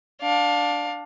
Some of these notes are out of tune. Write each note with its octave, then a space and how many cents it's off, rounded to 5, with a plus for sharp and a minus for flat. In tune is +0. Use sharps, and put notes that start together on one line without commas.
D4 +0 F5 +25